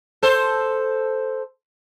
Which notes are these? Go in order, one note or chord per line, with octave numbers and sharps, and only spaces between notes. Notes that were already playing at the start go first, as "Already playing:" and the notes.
A4 C5